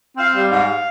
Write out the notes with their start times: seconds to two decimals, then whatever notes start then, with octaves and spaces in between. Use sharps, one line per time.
0.17 C4 F5
0.33 G3 F5
0.50 G#2